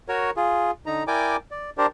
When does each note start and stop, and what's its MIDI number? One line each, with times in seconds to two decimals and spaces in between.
0.09 0.30 66
0.09 0.30 70
0.09 0.30 73
0.37 0.71 65
0.37 0.71 68
0.86 1.03 50
0.86 1.03 63
0.86 1.03 82
1.07 1.36 64
1.07 1.36 70
1.07 1.36 74
1.07 1.36 79
1.07 1.36 80
1.07 1.36 86
1.51 1.70 74
1.78 1.86 62
1.78 1.86 67
1.78 1.86 70
1.78 1.86 72
1.78 1.86 74